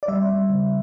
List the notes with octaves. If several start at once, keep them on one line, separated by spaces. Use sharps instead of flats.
D5
G3 E5
G3
C#3